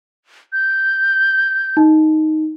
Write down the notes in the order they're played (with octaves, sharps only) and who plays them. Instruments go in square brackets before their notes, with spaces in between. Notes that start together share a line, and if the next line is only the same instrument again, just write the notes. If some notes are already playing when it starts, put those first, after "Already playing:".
[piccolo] G6
[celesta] D#4